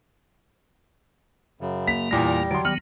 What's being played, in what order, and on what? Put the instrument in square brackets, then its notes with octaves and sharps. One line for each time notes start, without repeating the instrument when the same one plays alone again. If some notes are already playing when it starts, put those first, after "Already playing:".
[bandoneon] F#2 C#3
[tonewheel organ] A#3 [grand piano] B6
[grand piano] E2 A#2 A#6 [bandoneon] G3
[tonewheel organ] D3 [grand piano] F#3 C6
[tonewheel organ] D#3 F#3 B3 [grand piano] F6